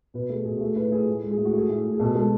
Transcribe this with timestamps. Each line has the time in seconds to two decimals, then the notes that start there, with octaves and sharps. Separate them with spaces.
0.14 B2 B4
0.29 A3 G#4
0.45 B2 G#4
0.57 F#4
0.61 A3 G#4
0.76 A2 B4
0.92 A2 G#4
1.08 A2
1.23 G#3
1.31 G#4
1.38 A2
1.45 F#4
1.53 A3 G#4
1.69 A2
1.84 A2
1.93 G#4
1.99 B2 A4
2.15 G#3 A4